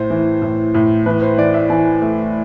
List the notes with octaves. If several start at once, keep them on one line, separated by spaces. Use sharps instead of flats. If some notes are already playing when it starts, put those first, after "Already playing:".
Already playing: A2 C5
E3
A2
A2
E3 B4
C5
E3 D5
E5
E3 G#5
A3